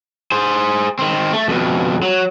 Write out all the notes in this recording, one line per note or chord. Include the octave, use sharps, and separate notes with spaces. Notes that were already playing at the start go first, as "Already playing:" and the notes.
G#4 C5
D#3 C4
A3
F2 B2
F#3